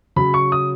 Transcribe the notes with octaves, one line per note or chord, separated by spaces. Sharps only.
C#3 F#3 B5
C#6
D#6